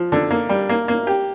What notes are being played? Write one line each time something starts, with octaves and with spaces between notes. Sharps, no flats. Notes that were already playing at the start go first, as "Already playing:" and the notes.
Already playing: F3
D3
A#3
G3
A#3
A#3
G4